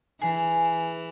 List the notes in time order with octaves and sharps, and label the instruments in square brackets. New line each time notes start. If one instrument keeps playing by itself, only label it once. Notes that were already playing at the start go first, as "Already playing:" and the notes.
[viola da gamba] E3 [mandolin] G#4